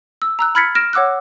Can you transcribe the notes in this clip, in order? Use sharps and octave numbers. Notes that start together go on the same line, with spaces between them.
E6
A#5 E6 F#6
B5 F6 G#6 A6 B6 C#7
F6 A#6 D7 E7
C#5 F#5 D6 E6 F#6